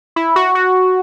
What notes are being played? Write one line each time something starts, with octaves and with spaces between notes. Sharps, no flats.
E4
F#4
F#4